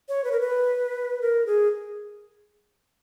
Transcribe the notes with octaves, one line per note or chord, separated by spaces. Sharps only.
C#5
B4
A#4
B4
A#4
G#4